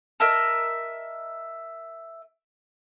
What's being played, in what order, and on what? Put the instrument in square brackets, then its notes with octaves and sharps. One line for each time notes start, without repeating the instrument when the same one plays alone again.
[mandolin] A#4 D#5 E5 A5